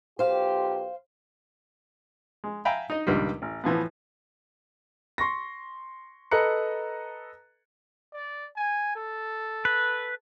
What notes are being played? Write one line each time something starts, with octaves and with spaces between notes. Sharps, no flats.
B1 F4 G4 C5 F5
G#3
E5 F5 G5 G#5 A#5 B5
D#4 D#5
C#2 G2 A#2 D#3 G3
A1
A2 E3 F3 B3
C6 C#6 A#6
A4 B4 D#5 A#5 F#6 C#7
D5
G#5
A4
B4